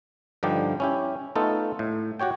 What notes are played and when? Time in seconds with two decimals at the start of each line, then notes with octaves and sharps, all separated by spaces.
0.43 G2 D3 F3 G3 D#4 G4
0.80 C#4 E4 G4
1.36 A3 B3 D#4 F4 A4
1.79 A2
2.19 F#4 G4 C#5 G5